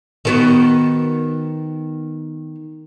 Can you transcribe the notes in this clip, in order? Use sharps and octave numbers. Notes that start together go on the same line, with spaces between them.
D#3 B3 F#4